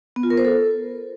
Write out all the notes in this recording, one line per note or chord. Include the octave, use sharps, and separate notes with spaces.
B3
F4
A#4
C5
A4